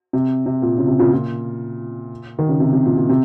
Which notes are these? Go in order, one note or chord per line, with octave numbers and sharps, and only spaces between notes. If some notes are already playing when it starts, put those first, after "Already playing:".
C3
C3
A#2
C#3
C3
A#2 C#3
A#2
D#3
C#3
C3
C3
A#2
A#2
C3